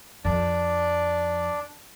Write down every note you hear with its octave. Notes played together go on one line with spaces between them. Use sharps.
F2 D4 D5